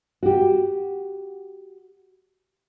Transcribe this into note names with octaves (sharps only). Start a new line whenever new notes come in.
F#4 G4